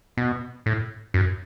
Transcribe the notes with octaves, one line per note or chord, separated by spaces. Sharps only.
B2
A2
F#2